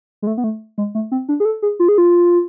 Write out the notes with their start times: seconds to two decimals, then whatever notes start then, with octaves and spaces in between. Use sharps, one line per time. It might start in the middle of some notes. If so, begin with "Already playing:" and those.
0.22 G#3
0.27 A3
0.38 B3
0.44 A3
0.78 G#3
0.95 A3
1.12 C4
1.29 D4
1.40 G#4
1.45 A4
1.62 G#4
1.80 F4
1.88 G#4
1.98 F4